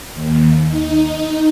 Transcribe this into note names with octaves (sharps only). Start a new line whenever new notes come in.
D#2
D#4